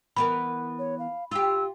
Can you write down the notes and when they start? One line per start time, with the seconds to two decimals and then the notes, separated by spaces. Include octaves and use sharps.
0.17 E3 B3 A#4 B5
0.79 C#5
0.99 F5
1.31 F4 G4 E6